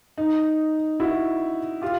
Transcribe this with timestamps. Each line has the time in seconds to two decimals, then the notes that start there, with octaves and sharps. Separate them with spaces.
0.18 D#4
1.00 E4 F#4
1.82 F4 G4